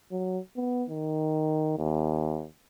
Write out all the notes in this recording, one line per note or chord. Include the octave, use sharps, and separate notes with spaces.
F#3
B3
D#3
D#2